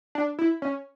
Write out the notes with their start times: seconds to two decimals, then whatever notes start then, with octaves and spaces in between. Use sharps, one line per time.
0.15 D4
0.39 E4
0.62 C#4